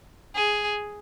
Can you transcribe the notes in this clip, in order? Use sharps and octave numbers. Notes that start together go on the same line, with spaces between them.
G#4